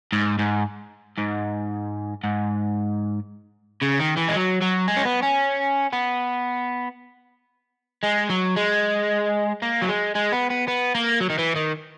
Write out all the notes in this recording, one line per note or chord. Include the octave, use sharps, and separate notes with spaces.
G#2
G#2
G#2
G#2
C#3
D#3
E3
G#3
F#3
F#3
G#3
C#4
B3
C#4
B3
G#3
F#3
G#3
A#3
F#3
G#3
G#3
B3
B3
B3
A#3
F#3
D#3
E3
D#3